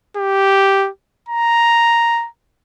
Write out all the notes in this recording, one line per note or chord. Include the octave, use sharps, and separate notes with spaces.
G4
A#5